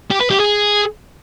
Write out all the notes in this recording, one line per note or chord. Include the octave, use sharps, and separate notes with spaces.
G4
B4
G4
G#4